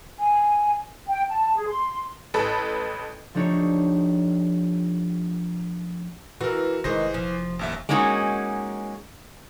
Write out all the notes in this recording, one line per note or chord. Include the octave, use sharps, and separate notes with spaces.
G#5
G5
A5
G#4
C6
A1 A4 B4 A5
F3 A3 D4 D#4 G4 C#5
E3 F#4 A#4
F1 D#3 E3 G#3 C5 A#6
F3
A1 D#2 E5
G#3 A#3 C#4 D#4 E4 F#4